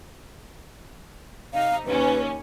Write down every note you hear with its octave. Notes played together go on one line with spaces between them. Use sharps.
C3 D#4 F5
D#2 C#4 B4